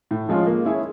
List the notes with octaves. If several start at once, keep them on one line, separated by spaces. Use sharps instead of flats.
A2
F3 G#3 C#4 F4
A#3
C#4 E4 G#4 C#5